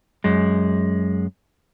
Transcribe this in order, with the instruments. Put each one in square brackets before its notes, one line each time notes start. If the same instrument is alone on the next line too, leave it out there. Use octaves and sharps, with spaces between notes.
[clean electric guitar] F#2 G#3